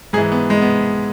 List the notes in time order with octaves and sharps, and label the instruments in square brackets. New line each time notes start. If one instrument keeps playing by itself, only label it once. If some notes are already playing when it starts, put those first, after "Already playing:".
[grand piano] G#2 G#4
E3
B3
G#3
B3